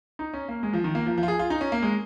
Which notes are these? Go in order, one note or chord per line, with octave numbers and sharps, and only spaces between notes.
D#4
C#4
A#3
G#3
F3
D#3
A#3
F3
F3
F4
G#4
F4
D#4
C#4
A#3
G#3